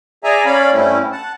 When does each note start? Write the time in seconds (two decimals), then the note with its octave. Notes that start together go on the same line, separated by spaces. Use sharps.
0.24 G#4 D5 E5 G#5 A#5
0.46 C#4 C#5 D5 F5 B5
0.73 G2 G3 A3 C4 C#4 E4
1.12 F#5 A5